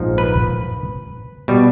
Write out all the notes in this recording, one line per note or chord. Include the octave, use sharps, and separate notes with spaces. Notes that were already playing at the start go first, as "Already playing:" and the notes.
Already playing: A#1 G#2 F3 A#3 D#4
B4
B2 G3